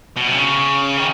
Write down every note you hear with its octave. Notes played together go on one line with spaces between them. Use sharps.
B2
C3
C#3
D#3